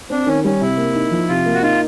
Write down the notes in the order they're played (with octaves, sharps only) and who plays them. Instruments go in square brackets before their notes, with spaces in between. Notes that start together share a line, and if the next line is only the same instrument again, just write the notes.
[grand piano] C4 [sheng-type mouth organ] D4
[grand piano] D#3 [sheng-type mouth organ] C#4
[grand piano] G3 [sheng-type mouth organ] C#4
[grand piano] C3 [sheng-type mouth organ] E4
[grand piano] A#3
D#4
F3
[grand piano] C3 [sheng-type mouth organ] F4
[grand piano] A#3
[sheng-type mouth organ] F#4
[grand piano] D#4 [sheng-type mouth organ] F4